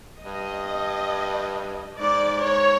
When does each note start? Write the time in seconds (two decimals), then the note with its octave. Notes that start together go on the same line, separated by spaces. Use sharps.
0.23 G2 D#5
1.99 G#2 D5
2.43 G#2 C#5